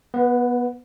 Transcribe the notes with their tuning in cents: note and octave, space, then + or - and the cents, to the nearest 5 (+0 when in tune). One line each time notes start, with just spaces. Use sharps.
B3 -20 B4 +15